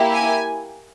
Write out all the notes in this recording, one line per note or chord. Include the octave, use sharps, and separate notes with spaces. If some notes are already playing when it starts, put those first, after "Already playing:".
Already playing: A#3 E4 G4
G#5